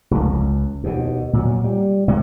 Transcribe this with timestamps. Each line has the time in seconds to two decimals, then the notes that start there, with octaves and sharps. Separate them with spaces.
0.11 F1 C#2
0.32 C#2
0.84 D#2 B2
1.33 A#2 F#3
1.64 G3
2.08 C3 G#3 C#4